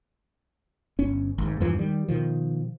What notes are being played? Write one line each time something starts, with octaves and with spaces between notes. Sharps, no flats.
G1 C#4
G#1 G#2
E2 G2 E3 F3
D#3 G3
B2 D#3 F3